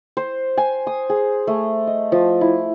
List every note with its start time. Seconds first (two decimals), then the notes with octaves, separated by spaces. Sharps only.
0.17 C5
0.57 G#5
0.87 D#6
1.10 G#4
1.47 A3
1.87 D#5
2.12 F3
2.41 E4